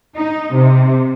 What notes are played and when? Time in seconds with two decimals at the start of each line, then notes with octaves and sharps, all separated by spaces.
0.17 D#4
0.53 C3